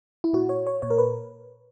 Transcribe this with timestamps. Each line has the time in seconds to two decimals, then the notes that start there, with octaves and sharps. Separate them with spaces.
0.24 E4
0.33 A#2 F#4
0.49 C#5
0.67 C#5
0.82 A#2 C#5
0.90 A#4
0.98 B4